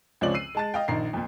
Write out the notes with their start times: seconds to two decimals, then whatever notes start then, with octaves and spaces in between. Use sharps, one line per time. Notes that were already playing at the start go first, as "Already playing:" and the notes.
0.21 C#2 F3 C4 C#4 D5 F#7
0.34 E6 C7 D#7
0.55 G#3 A5 A6
0.74 D#5 F5 G5
0.88 A#1 D#3 A#5 C7
1.13 F2 A#2